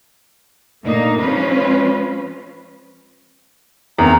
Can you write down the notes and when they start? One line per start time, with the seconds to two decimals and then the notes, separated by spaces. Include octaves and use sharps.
0.85 A#2 D3 A3 A#3 D#4
1.20 F3 G#3 C#4 F4 B4 C5
3.98 E2 D#3 C4 A#5